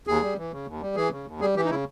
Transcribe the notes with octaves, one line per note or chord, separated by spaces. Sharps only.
D#2 G#4
G3
E3
C#3
D#2
G3
E3 G#4
C#3
D#2
G3 G#4
E3 G4
D#4
C#3 E4